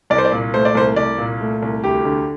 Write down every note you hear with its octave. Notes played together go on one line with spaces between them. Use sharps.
C2 D5
C5
D5
A#2
A3 C5
D5
C2 C5
C2 D5
A#2
A3
C2
D2 G4
D3